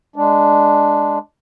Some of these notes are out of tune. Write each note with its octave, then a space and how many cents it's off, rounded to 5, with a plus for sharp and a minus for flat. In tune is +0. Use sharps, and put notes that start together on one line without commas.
G#3 +0 D4 +0